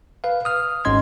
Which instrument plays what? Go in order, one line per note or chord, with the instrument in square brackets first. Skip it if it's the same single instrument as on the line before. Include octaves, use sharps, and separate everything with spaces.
[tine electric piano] B4 F5
D#6 F6
G#1 G#2 C#4 D#5 C6 G#6